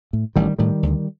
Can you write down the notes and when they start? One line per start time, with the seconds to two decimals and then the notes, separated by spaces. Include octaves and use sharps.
0.13 A2
0.36 A1 D#3 G3
0.59 A2 D#3 G3
0.83 D2